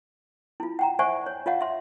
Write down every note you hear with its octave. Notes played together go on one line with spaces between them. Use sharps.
E4 F4
F#5 G5 A#5
C5 D5 E5 F#5 G#5 C#6
C#5
F4 C#5 D#5 F5 F#5
E5 C6